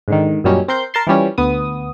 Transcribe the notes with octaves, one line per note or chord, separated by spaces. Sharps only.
G#2 D3 D#3
F#2 A#2 F#3 G3 C#4 D#4
C4 A#4 C6 G6
A#4 A5 C6
E3 F3 G3 C#4
D2 B3 D#6